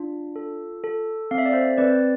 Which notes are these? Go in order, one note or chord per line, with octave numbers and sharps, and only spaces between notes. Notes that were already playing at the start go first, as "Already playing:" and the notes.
Already playing: D4 F4
A4
A4
C4 F5
E5
D5
C5 E5
C4 B4 D5